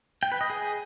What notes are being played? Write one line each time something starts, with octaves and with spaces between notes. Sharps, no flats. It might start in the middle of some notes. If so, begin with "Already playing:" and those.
G5
B4
D#5
G#4